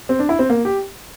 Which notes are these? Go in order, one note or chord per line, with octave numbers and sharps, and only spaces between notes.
C4
D4
E4
C4
A#3
G4